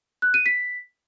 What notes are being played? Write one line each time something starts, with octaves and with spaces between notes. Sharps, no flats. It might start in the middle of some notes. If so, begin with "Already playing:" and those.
F#6
D#7
B6